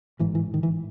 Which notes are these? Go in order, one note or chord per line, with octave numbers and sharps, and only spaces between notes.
A1 G#2 E3
E3
D#3
E3